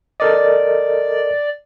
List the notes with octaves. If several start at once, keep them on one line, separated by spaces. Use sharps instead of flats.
A4 A#4 D5 D#5